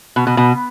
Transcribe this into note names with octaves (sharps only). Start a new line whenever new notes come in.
B2
B2
B2